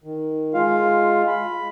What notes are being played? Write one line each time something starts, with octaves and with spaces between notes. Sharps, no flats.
D#3
G#3 F4 F5
B5